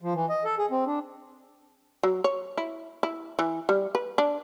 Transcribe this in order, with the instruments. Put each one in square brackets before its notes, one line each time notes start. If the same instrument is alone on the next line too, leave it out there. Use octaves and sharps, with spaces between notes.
[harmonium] F3
E3
D#5
A4
G#4
C4
D4
[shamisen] F#3
C#5
E4
E4
E3
G3
B4
D4